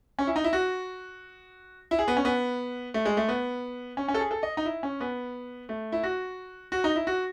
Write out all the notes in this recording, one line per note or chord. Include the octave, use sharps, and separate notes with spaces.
C#4
E4
D#4
E4
F#4
E4
G#4
B3
C#4
B3
A3
G#3
A3
B3
C#4
C#4
A4
G#4
A4
D#5
D#4
E4
C#4
B3
A3
E4
F#4
F#4
D#4
E4
F#4